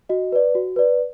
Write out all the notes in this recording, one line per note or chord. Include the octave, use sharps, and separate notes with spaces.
F#4 D#5
B4 D5
F#4
B4 D5